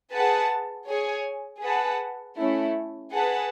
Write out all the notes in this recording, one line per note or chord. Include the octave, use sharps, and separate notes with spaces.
G#4 B4 F#5 A5
G#4 C#5 G#5
G#4 B4 F#5 A5
A3 C#4 E4
G#4 B4 F#5 A5